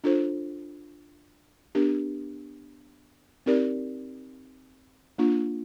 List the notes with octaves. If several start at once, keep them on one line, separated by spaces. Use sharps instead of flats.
D4 F4 A4 C5
B3 D4 G4 A#4
C4 D#4 G4 A#4 D5
A#3 D4 F4